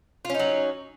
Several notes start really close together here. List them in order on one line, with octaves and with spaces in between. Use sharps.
F4 C#4 D#4 F#3